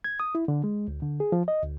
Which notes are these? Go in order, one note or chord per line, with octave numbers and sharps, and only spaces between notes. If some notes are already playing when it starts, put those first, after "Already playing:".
G#6
D#6
E4
D3
G#3
D2
D3
G#4
F3
D#5
D2